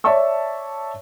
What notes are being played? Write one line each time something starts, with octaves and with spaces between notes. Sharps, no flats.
C#5 D5 E5 A5 C#6 E6